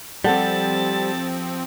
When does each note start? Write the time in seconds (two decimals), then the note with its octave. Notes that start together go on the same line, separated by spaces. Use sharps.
0.25 F3 G3 C4 G4 A4 F#5 A5